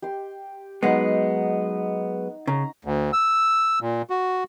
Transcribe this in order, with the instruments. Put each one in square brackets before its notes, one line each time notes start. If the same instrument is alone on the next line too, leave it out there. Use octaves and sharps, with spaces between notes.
[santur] G4 C6
[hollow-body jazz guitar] F#3 G#3 B3 [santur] D#4 F#5
[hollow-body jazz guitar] C#3 [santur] A#5
[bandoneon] D2
E6
A#2
F#4